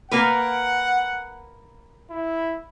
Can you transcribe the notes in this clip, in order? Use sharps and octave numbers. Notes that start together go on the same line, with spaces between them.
A#3 A#4 B4 F#5
E4